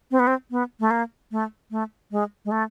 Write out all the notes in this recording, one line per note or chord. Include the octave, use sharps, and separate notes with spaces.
C4
B3
C4
B3
A3
A#3
A3
A3
G#3
G#3
A3